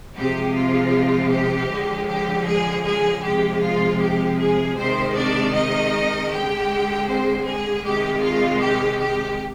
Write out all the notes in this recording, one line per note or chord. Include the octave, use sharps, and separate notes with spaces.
C3 F3 G#3 G4
F4
G4
D3 F3 G#3
G4
G#3 G#4
G#3 G#4
C3 F3 G#3 G4
F4
G4
G#3 G#4
C3 D#3 G#3 C4 C5
D4 D5
D#4 D#5
D3 G#3 G4 G5
C4 C5
G#3 G#4
C3 D#3 G#3 G4
F4
G4
G4